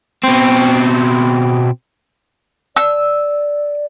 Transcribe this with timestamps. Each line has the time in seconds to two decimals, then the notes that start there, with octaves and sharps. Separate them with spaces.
0.24 B2 C4
2.77 D5 E6